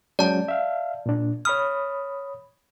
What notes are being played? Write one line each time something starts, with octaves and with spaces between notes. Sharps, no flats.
F#3 G#3 C#4 D5 A5
E5 F5
A#2 D4
C#5 B5 D#6 F6